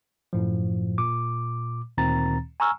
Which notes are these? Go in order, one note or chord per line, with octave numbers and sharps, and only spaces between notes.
F#2 A2 F3
A#2 D6
D2 A#2 D#3 C4 A#5 A6
G#5 A#5 C#6 E6 F6